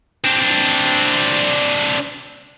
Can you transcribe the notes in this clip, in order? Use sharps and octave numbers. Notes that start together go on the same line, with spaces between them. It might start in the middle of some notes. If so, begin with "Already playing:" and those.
C4 D4